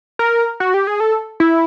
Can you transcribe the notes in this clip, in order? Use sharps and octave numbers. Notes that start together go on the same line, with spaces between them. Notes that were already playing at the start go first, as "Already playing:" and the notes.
A#4
F#4
G4
G#4
A4
E4